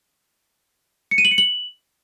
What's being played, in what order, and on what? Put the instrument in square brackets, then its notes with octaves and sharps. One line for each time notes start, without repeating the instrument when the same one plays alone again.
[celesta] C#7
D#7
F#7
C#7
F#7